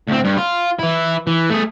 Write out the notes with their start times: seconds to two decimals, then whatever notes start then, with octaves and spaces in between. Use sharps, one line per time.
0.07 D2 C4
0.24 G2
0.37 F4
0.79 E3 E4
1.27 E3
1.50 A3 G#4